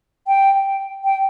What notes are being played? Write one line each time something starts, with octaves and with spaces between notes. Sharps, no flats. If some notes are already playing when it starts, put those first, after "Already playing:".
G5
G5